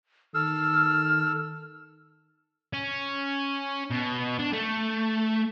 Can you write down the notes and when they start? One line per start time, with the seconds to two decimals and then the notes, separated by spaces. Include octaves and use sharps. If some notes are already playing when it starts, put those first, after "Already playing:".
0.35 D#3 A4 E6 F6
2.73 C#4
3.91 B2
4.39 D4
4.53 A3